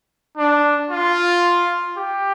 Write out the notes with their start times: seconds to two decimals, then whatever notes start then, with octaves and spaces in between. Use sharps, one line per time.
0.37 D4
0.90 F4
1.97 G4